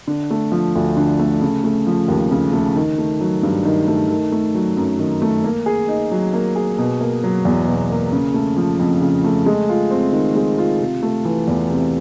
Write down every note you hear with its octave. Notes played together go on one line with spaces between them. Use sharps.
D3
A3
F3
D2
D3
A3
C#3
A3
F3
D#2
C#3
A3
D#3
A3
F#3
G2
D#3
A3
D#3
A3
F#3
F#2
D#3
A3
A#3
G#4
D#4
F#3
A#3
G#4
B2
A#3
F#3
E2
B2
A#3
C#3
A3
F3
F2
C#3
A3
G#3
F4
C4
D#3
G#3
F4
C3
A3
E3
E2
C3